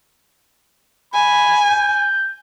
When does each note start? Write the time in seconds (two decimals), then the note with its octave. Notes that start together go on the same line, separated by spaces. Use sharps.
1.14 G#5 B5
1.70 G6